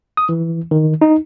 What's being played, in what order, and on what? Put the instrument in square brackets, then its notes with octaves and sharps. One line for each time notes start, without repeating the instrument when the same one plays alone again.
[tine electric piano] D#6
E3
D#3
D#4